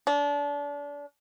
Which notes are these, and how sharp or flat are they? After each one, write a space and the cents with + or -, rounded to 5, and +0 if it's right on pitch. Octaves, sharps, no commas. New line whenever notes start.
D4 -30